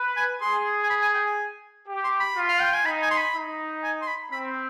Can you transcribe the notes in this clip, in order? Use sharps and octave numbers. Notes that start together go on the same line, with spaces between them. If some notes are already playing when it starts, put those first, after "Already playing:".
Already playing: B4
G#5
G#4 C6
G#5
B5
G#5
G5
G#5
G4
C6
B5
F4
F5
G5
G#5
D#4 B5
G#5
C6
B5
D#4
G#5
C6
B5
C4 B5